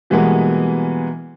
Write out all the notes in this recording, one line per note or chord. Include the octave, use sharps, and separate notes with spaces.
B2 E3 G3 G#3 A#3 B3